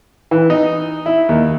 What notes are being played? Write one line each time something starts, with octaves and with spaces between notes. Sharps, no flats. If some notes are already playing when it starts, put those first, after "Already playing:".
E3
D#4
E4
D#2